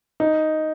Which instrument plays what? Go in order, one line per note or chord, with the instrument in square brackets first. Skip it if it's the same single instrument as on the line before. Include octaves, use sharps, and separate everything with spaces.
[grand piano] D#4